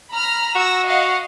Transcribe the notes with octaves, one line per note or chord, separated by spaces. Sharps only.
A#5 B5 F6
F#4 E6 A#6
D#5 F5 F#5